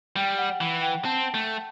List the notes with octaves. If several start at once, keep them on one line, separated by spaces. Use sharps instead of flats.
G3 G5
F#5
E3
G5
C4 A5
A3